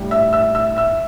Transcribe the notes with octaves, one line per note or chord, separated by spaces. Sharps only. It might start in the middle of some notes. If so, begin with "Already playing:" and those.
Already playing: A2 G3 D4
E5 E6
E5 E6
E5 E6
E5 E6